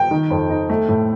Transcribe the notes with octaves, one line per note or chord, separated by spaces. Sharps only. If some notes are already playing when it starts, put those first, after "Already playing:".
Already playing: G5
D#3
F2
D#4
A3
A2